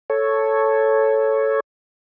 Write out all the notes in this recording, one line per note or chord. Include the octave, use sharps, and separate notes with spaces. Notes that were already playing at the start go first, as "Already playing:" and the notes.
A4 C#5